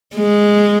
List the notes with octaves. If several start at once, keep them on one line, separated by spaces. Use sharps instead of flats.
G#3